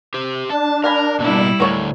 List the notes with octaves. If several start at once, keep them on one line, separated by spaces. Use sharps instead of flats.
G4 C5
D4 A5
A#4 F5 G#5 B5
B2 G3 A#3 E4 E6
D2 A2 A#4 C#5 A5